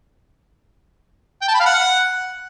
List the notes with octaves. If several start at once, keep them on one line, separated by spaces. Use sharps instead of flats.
G5
A5
B5
F5
F#5